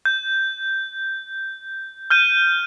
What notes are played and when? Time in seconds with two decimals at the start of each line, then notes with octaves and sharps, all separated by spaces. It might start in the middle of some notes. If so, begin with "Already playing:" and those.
0.05 G6
2.10 F6 G6 D#7